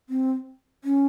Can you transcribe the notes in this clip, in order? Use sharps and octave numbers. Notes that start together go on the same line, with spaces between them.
C4
C#4